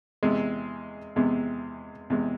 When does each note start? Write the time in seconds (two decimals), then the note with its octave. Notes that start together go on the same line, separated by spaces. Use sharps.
0.23 E2 C3 G#3
1.16 E2 C3 G#3
2.10 E2 C3 G#3